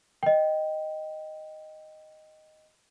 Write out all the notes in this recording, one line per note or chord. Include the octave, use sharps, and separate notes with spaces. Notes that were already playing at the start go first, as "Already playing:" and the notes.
D#5 G5